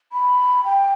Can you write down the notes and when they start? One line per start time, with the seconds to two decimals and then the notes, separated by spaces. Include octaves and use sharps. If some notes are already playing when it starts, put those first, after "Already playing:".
0.12 B5
0.64 G5